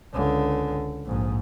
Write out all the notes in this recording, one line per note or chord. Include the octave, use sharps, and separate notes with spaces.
C#2 D3
A#1 G#2